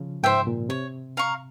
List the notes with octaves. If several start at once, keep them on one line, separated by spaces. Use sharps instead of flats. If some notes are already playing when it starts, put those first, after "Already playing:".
Already playing: C#3 F3
G#2 C5 E5 G5
A#2
C3 C#5
F5 A#5 C#6